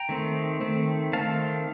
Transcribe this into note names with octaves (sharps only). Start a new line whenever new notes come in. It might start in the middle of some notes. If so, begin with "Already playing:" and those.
Already playing: G5 A#5
D#3 A3 C4
D#3 A3 C4
D#3 A3 C4 F5 A5